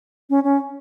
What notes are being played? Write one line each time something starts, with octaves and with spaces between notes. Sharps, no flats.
C#4
C#4